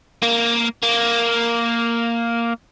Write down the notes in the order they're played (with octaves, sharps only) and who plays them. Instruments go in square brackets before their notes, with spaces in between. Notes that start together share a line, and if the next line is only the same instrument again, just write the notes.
[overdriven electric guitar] A#3
A#3